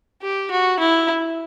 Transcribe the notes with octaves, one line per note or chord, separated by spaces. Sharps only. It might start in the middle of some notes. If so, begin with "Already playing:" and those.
G4
F#4
E4